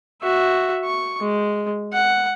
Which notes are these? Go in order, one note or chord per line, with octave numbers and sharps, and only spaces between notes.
F#4 E5
C#6
G#3
F#5